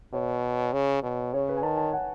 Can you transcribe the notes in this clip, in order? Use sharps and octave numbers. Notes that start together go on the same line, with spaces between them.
B2 C#5
C#3
B2
C#3 C#5
B4
G#5
D#3 A5
A5
F#5